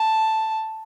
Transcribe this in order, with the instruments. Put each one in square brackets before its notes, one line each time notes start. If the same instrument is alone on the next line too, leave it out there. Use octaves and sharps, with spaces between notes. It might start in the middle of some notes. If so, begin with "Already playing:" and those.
Already playing: [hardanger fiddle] A5